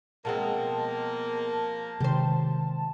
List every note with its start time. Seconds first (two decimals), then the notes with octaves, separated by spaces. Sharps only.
0.25 B2 F3 G#3 A#3 C4 A5
2.00 C3 D#3 G#3 G4 C5